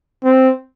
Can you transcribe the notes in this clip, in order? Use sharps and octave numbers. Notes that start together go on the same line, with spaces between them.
C4